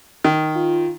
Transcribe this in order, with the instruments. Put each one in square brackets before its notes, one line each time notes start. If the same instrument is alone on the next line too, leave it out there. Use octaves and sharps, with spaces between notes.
[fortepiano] D#3
[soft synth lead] F4